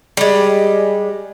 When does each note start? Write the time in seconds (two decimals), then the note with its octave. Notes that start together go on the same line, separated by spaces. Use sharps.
0.17 G3 G#3